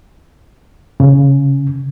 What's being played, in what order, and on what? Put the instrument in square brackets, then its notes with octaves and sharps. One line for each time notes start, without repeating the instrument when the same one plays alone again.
[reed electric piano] C#3